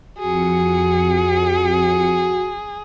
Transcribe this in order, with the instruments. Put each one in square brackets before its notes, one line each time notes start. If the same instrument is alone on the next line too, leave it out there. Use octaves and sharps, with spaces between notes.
[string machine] F2 C#7 [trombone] F#4 [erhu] G#4